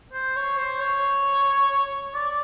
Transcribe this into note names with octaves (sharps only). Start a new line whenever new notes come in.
C5
C#5
C5
C#5
D5